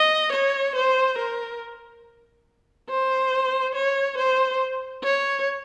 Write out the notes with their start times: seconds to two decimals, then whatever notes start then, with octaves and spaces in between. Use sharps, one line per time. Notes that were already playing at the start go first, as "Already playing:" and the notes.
Already playing: D#5
0.32 C#5
0.75 C5
1.18 A#4
2.89 C5
3.75 C#5
4.18 C5
5.04 C#5